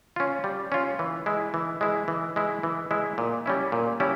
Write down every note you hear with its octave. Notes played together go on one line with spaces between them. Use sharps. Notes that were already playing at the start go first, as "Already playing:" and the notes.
C#4 F4
G3
C#4 F4
E3
G#3 E4
E3
G#3 E4
E3
G#3 E4
E3
G#3 E4
A#2
G3 C#4 E4
A#2
G3 C#4 E4